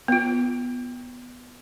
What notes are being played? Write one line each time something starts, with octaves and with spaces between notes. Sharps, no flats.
B3 F4